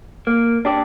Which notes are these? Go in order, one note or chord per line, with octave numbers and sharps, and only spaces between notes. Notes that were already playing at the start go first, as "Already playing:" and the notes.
A#3
D4 G4 D5